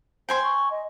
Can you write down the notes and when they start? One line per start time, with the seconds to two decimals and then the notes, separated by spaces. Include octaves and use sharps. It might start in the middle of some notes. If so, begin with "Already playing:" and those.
0.29 C5 G5 G#5 C6
0.43 C#6
0.70 D#5